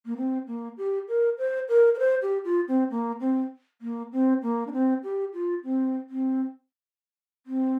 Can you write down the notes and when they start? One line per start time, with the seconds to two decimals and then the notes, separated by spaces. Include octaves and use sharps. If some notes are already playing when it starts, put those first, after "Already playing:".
0.06 A#3
0.17 C4
0.47 A#3
0.77 G4
1.08 A#4
1.38 C5
1.68 A#4
1.95 A#4
1.99 C5
2.22 G4
2.44 F4
2.68 C4
2.91 A#3
3.20 C4
3.81 A#3
4.12 C4
4.42 A#3
4.67 D4
4.73 C4
5.03 G4
5.33 F4
5.64 C4
6.09 C4
7.46 C4